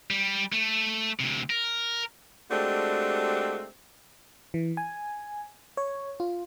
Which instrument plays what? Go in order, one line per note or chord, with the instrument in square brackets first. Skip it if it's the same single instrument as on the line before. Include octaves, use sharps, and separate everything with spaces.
[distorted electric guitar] G3
A3
D2 C3
A#4
[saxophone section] G#3 A3 C4 D4 F#4 G4
[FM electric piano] E3
G#5
C#5
F4